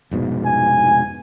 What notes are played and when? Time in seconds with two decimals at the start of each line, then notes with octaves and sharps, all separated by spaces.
0.11 F1 G#2 B2
0.46 G#5